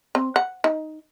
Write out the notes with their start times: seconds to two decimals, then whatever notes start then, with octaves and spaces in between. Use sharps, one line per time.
0.15 C4
0.36 F#5
0.64 D#4